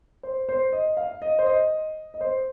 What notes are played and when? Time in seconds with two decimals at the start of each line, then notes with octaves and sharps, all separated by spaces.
0.23 C5
0.49 C5
0.73 D#5
0.97 F5
1.22 D#5
1.39 C5
1.46 D#5
2.14 D#5
2.21 C5